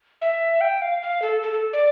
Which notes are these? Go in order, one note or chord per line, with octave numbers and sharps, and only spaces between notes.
E5
G5
F5
F5
A4
A4
A4
D5